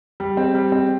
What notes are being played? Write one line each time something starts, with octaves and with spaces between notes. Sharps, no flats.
G3
C4
G3
C4